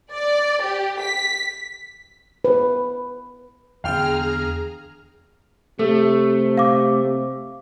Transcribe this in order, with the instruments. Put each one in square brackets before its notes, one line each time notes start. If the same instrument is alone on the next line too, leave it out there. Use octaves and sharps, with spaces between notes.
[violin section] D5
G4
B6
[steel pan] B4
[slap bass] E2 D3 [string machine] G#4 A#5 [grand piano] F5 G5 [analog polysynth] F6
[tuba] C3 [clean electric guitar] A3 [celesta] A4
[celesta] F5 D6